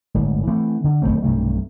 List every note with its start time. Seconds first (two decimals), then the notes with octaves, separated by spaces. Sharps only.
0.14 D1 G1 G#2
0.47 E3 A3 B3 C4
0.84 D3
1.02 D1 G#2 A3 C4
1.23 B1 G2 C3 A3